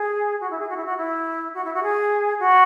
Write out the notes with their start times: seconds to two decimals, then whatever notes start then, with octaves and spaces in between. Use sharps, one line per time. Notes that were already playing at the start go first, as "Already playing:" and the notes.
Already playing: G#4
0.40 F#4
0.50 E4
0.59 G#4
0.69 F#4
0.76 E4
0.85 F#4
0.97 E4
1.54 F#4
1.64 E4
1.74 F#4
1.83 G#4
2.39 F#4